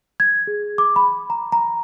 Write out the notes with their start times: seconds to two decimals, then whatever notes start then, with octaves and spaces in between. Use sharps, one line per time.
0.20 G#6
0.47 G#4
0.78 D6
0.96 B5
1.30 A#5
1.52 A#5